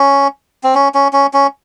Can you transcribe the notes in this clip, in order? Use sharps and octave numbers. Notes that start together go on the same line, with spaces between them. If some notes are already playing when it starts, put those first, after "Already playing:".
Already playing: C#4
C4
C#4
C#4
C#4
C#4